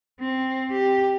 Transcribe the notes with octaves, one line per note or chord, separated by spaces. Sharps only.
C4
G4